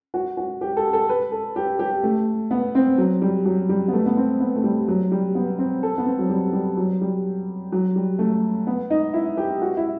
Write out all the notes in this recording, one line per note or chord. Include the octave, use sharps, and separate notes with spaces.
F#4
F#4
G4
A4
A4
B4
A4
G4
G4
A3
B3
C4
F#3
G3
F#3
G3
B3
A3
B3
C4
B3
A3
G3
F#3
G3
B3
C4
A4
B3
C4
F#3
G3
G3
F#3
G3
F#3
G3
A3
B3
D#4
E4
G4
F#4
E4